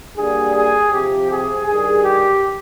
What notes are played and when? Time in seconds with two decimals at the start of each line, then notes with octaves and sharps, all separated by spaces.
0.17 D3 G3 A#3 G#4
0.55 G#4
0.92 C3 F3 C4 G4
1.30 G#4
1.66 G2 D#3 G3 G#4
2.03 G4